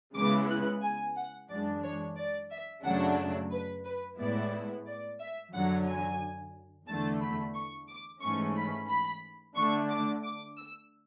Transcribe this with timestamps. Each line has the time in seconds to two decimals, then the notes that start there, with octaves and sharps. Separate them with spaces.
0.15 C#3 G#3 B3 E4 D6
0.49 F#6
0.83 G#5
1.16 F#5
1.49 F#2 E3 G#3 D4 D5
1.83 C#5
2.17 D5
2.51 E5
2.84 F#2 C#3 F#3 A3 D4 F#5
3.51 B4
3.84 B4
4.18 A2 G#3 B3 E4 D5
4.86 D5
5.19 E5
5.52 F#2 D3 F#3 F#5
5.86 G#5
6.87 E2 D3 A3 A5
7.21 B5
7.55 C#6
7.88 D6
8.21 G#2 E3 A3 C#4 C#6
8.56 B5
8.89 B5
9.56 D3 A3 D4 C#6
9.90 D6
10.23 D6
10.57 E6